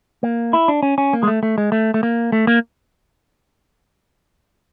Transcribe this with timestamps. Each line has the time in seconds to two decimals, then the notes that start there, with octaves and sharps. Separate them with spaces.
0.23 A#3
0.53 E4
0.68 D4
0.83 C#4
0.98 C#4
1.13 A#3
1.23 G#3
1.28 A3
1.43 A3
1.58 G#3
1.72 A3
1.94 A3
2.03 A#3
2.32 A3
2.47 A#3